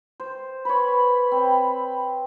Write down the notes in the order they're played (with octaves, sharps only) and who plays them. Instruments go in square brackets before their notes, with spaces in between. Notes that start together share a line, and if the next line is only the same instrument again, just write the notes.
[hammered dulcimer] C5
[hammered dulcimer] B4 C#5 [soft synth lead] B5
[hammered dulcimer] C4